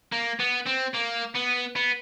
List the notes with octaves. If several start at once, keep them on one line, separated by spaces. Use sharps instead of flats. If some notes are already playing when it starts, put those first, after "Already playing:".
A#3
B3
C4
A#3
B3
B3